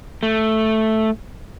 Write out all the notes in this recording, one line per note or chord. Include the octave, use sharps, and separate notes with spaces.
A3